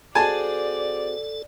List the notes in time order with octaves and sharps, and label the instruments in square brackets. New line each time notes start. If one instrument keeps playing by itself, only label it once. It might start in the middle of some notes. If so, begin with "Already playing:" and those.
[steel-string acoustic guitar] C4 F#4 G#4 [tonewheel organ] A4 [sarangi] D5 [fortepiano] G#5 A5